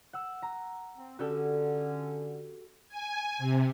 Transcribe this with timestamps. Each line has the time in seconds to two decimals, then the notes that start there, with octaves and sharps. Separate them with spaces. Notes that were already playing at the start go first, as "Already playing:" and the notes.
0.13 F#5 E6
0.42 A#5
0.97 C4
1.19 D3 C#4 F#4 G4 A4
2.89 G#5
3.38 C3